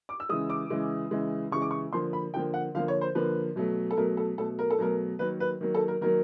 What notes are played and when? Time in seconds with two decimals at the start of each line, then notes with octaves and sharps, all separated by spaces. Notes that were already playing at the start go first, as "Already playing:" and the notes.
0.09 D6
0.20 E6
0.29 C#3 E3 G#3 D#6
0.50 D6
0.70 C#3 E3 G#3
1.11 C#3 E3 G#3
1.51 C#3 E3 G#3 C#6
1.62 D6
1.71 C#6
1.93 D3 F3 A#3 C6
2.13 B5
2.34 D3 F3 A#3 G5
2.54 F#5
2.75 D3 F3 A#3 F5
2.88 C#5
3.01 C5
3.15 D3 F3 A#3 B4
3.56 B2 F#3 A3
3.91 A4
3.97 B2 F#3 A3 A#4
4.17 A4
4.38 B2 F#3 A3 A4
4.59 A#4
4.70 A4
4.78 B2 F#3 A3 A#4
5.19 D#3 F#3 A#3 B4
5.40 B4
5.61 D#3 F#3 A#3
5.75 A4
5.88 A#4
6.01 D#3 F#3 A#3 A#4